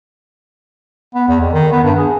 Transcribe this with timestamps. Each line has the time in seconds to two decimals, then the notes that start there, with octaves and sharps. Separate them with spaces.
1.15 B3
1.28 E2
1.41 F2
1.53 D#3
1.72 B3
1.84 G2
1.98 G#4